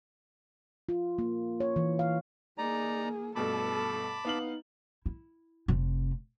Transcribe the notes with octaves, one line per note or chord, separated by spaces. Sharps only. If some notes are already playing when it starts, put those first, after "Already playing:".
F4
A#3
C#5
E3
F5
A#3 D#4 G#4 D5 A#5
G2 B2 A3 A4 A5 B5 D6
B3 D#4 F5 F#7
E4
F1 C3